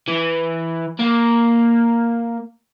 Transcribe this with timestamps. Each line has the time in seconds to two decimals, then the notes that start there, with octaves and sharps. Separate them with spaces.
0.08 E3
0.99 A#3